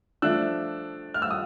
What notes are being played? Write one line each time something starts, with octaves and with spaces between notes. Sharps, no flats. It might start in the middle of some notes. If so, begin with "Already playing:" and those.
F3 A3 D4 E6 F#6
F6
E6
D#6